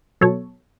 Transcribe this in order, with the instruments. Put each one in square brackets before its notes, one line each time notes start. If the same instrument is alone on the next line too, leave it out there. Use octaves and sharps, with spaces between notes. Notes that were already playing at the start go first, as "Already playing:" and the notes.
[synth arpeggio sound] B2 F#3 A4 C#5